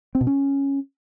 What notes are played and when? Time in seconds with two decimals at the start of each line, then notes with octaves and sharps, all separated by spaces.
0.15 C4
0.21 B2
0.27 C#4